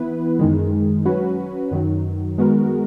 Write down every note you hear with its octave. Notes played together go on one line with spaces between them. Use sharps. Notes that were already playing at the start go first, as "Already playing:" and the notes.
Already playing: E3 B3 E4 B4
F#2 D#3 G#3
F#3 C#4 F#4 B4
F#2 D#3 F#3
D#3 G#3 B3 F#4 A#4